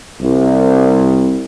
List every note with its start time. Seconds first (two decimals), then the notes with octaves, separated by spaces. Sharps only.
0.20 C2